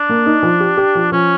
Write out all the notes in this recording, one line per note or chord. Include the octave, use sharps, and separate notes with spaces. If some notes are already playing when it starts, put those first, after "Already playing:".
Already playing: D4
A#3
D#4
F3
G4
G4
F3
F3 C#4